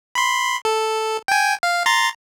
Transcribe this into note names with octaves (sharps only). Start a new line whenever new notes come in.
B5 C6
A4
G5 G#5
F5
A#5 C6 A6